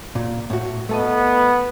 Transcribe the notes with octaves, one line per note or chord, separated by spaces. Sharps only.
A#2
A2 F#4
A3 B3 A4 D#5